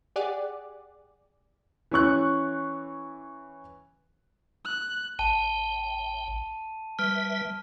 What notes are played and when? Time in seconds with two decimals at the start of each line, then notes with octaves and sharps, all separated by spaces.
0.16 G4 G#4 D5 F#5
1.91 E3 C#4 C#6 F#6
4.65 F#6
5.19 A1 G5 A5 D#7
6.99 G3 B4 E5 F6